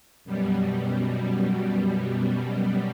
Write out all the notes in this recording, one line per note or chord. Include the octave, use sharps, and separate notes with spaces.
F#2 B2 G3